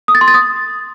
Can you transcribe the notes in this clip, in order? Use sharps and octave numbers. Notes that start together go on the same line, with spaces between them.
D#6
A6
C6
A6
D#6